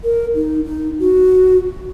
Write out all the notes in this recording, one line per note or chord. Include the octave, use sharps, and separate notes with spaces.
A#4
D#4
D#4
F#4